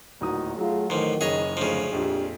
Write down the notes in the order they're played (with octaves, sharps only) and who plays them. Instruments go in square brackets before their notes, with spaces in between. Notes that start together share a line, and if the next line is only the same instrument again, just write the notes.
[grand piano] D1 D#4 D#6 [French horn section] D#2 A#2 F#4
[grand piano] F#3 [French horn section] A3 F4 G#4
[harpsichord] A1 F3 [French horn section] D#3
[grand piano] F#1 C#4 D#5 [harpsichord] G#4 C#5
[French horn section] D2 G#2 [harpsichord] C#3 F3
[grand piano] A#1 F2 [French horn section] D4 G4